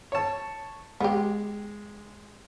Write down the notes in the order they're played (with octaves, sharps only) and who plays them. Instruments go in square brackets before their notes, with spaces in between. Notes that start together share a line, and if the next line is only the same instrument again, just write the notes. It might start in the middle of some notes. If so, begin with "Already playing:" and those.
[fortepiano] C#5 A5
[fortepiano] G#3 [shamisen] B3 G4